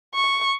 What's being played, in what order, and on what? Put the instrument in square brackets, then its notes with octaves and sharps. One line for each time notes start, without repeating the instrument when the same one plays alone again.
[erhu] C#6